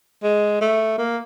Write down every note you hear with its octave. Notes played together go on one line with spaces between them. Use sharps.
G#3
A3
A#3